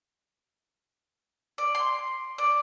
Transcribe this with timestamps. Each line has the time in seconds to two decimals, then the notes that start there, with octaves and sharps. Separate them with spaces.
1.58 D5
1.75 C6
2.38 D5